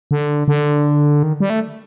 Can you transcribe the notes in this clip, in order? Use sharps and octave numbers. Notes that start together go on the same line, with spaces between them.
D3
D3
D#3
G3
A3